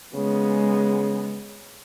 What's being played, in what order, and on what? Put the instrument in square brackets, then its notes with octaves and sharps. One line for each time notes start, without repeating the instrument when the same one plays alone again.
[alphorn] C#3 [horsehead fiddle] G#3 B3